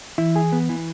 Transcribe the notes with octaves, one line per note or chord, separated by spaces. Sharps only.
E3 E4
G#4
B3
E3